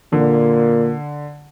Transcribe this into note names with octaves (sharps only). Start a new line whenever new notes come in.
A#2 D3